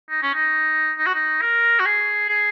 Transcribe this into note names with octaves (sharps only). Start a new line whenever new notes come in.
D#4
C#4
D#4
D#4
F#4
D#4
A#4
F#4
G#4
G#4